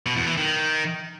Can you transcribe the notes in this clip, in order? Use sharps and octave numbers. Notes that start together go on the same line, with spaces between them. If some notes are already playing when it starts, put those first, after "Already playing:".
B2
E2
E3
D#3